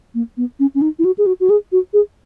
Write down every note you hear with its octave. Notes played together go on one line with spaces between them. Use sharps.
A#3
B3
C#4
C#4
D#4
E4
F#4
G#4
F#4
F#4
G#4
F#4
G#4